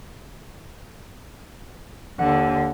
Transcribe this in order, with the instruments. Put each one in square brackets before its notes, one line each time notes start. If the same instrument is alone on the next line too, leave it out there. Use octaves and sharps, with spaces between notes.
[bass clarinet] D#2 [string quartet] D3 [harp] F#5